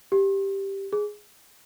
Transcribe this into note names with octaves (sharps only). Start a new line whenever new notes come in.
G4
G#4